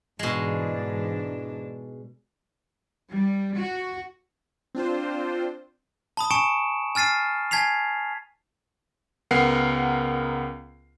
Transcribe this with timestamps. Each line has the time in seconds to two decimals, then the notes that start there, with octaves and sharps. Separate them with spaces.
0.19 G#2 B2 E3 G#3 D4
3.10 G3
3.57 F#4
4.75 C4 D4 F4 C5
6.17 A5 B5 D#6
6.31 G#5 A5 C#6 C#7 D7 E7
6.95 G#5 F6 A6 C7 D#7
7.51 G#5 A5 G#6 B6 C7 F7
9.31 C#2 B3 A#4 F#5 C7